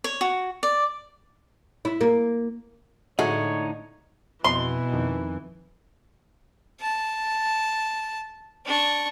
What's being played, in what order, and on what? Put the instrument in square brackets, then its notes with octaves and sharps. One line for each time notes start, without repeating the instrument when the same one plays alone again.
[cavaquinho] C#5
F#4
D5
[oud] E4
A#3
[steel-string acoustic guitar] A2 D3 [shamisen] F#3 G#3 A3 [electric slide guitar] D#4 [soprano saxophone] C#5
[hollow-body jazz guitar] F2 D#5 [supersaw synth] B2 [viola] E3 [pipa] C6
[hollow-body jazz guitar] F2 D#3
[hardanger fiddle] A5
D4 C#6